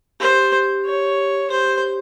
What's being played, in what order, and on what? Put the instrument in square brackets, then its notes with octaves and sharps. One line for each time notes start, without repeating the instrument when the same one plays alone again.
[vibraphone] G4 [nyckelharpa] C5
[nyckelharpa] C#5
[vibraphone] G4 [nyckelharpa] C5